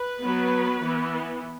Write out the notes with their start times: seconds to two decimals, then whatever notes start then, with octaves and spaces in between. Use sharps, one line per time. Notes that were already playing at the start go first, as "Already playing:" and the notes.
Already playing: B4
0.19 F#3 B3
0.80 E3 B3